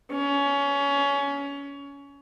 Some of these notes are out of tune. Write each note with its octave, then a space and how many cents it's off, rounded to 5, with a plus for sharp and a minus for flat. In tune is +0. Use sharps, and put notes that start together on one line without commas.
C#4 +20